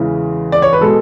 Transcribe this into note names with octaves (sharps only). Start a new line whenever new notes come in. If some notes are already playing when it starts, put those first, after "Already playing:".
Already playing: E2 C#3 E3 G#3
D5
C#5
B4
B2 G#3 A4